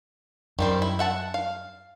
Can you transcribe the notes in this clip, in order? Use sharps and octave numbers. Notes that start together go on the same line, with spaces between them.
F#2 D#3 G3 C5
E4
E5 F#5 A5
F5